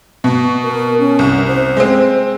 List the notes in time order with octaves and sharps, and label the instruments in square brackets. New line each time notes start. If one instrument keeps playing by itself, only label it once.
[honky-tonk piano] B2
[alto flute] A#4
C#4
[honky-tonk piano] C2
[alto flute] C5
[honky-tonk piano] G#3 C4